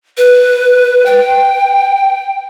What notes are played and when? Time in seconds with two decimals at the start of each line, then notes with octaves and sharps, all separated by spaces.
0.18 B4
1.06 G5